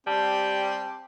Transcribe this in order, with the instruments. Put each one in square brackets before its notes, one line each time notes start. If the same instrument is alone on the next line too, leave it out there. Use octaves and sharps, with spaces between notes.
[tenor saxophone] G3 [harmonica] C4 G4 [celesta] A5